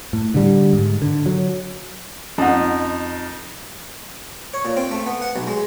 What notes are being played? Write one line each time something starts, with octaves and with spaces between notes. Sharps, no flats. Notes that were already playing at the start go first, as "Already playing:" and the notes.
A2
D3 G3
G#2
D3
F#3
F2 C#4 D#4 F#5
C#5
A#2
C4
A3
B3
F#5
B1
G#3